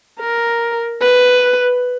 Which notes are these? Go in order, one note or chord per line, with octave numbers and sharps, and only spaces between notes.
A#4
B4